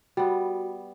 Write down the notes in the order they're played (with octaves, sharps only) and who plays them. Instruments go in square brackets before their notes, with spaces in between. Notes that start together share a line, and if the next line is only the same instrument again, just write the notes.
[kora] G3 B3 [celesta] F#4